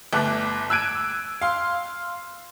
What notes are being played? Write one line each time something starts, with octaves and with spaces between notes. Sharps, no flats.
G1 A3 D6 F#6
E6 F#6 G#6 D7 D#7
F5 C6